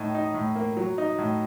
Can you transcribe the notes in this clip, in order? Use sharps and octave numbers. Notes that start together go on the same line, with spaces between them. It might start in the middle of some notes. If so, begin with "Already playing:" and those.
Already playing: A2 D#4
D#4
A2
A#3
F#3
D#4
A2